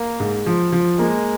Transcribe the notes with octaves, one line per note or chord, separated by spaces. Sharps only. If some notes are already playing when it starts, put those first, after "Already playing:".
Already playing: A#3
G#2
F3
F3
G#3 A#3